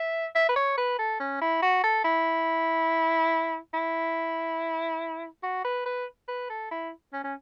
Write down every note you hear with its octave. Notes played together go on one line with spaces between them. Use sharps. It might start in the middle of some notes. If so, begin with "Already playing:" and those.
Already playing: E5
E5
B4
C#5
B4
A4
C#4
E4
F#4
A4
E4
E4
F#4
B4
B4
B4
A4
E4
C#4
C#4